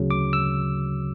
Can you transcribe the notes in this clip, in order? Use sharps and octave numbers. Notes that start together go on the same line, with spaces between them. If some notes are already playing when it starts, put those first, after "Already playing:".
Already playing: D2 C#3 F#3
D6
E6